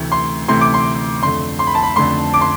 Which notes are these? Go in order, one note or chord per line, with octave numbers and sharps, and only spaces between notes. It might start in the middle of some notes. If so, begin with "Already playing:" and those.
Already playing: D2 C3 E3 A3
C6
D2 C3 E3 A3 C6
D6
C6
F2 D3 A3 C6
C6
B5
A5
B5
F2 D3 A3 C6
D6
C6